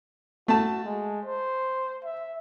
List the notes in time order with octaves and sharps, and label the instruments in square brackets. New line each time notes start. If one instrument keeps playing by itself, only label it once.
[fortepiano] A3 A5 [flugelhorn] F#4
[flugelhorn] G#3
C5
E5